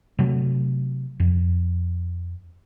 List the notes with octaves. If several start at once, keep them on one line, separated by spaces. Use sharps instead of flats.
C3 F#3 A3
F2